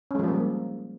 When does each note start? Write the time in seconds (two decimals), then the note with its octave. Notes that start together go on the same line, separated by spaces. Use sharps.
0.11 C#4
0.15 G#3
0.19 F3
0.24 G3
0.28 A#3